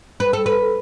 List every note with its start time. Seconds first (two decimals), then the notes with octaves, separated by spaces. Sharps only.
0.20 B4
0.33 A4
0.46 B4